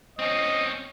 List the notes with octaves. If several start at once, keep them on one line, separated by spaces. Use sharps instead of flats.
C4 C#4 D#5